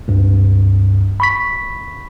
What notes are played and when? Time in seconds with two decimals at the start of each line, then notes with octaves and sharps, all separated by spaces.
0.08 C#2 G2
1.20 B5 C#6 B6